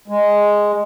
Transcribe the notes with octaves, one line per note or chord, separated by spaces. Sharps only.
G#3